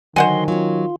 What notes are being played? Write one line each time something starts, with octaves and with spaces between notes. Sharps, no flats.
D3 D#3 F#3 C5 D#5 F#5 G#5 C6
F#3 C#4 F4